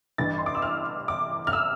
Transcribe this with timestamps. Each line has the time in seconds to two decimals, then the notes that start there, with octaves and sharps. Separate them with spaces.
0.18 A1 G2 E3 A6
0.38 C6
0.46 D6
0.55 E6
0.62 F6
1.08 D6
1.47 F6
1.53 E6